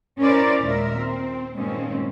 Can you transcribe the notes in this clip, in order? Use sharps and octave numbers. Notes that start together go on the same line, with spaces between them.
C#4 E4 A#4 C5 D5
D#2 A#2 G#3 A#4 E5
C4
G2 A#2 D#3 G#3 C4 C#4